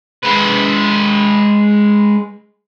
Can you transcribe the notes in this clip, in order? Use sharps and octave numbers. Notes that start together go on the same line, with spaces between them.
G#3 B4